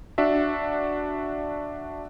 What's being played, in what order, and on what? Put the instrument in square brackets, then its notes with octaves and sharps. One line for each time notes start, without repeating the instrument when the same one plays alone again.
[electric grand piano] D4 F#4 E5